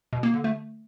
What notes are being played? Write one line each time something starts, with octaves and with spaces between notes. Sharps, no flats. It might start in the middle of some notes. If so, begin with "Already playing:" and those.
B2
A#3
D3
A3